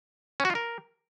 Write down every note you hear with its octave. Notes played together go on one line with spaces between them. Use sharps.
C#4
F#4
F4
A#4